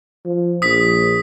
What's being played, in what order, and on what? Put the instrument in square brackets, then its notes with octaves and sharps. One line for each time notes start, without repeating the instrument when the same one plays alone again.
[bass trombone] F3
[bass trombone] A#1 [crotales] D#6 B6